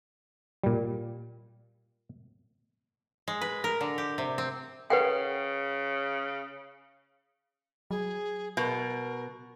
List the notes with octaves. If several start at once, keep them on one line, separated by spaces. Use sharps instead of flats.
A#2 G3
G#3
B4
A#4
D3
G4
C3
C4
C#3 B4 F#5 G5
F#3 G#4
B2 A#4